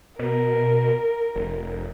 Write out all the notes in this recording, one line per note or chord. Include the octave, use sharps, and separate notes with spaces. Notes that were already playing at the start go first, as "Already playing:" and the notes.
B2 A#4
F1